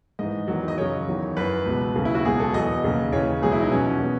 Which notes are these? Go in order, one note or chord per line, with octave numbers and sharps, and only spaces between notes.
G#2 E3 D#5
E2 D#3 F#3
D#5
F#2 C#3 F#3 C#5
E2 D#3 F#3
F#2 E3 B4
C#2 B2 F#3
D#2 C#3 F#3
E4
F#4
C#2 B2 F#3 G#4
A4
E2 B2 F#3 D#5
D#2 C#3 F#3
D#2 C#3 E3 C#5
C#2 B2 F#3 G#4
E4
D#4
E2 B2 F#3 C#4
B2 F#3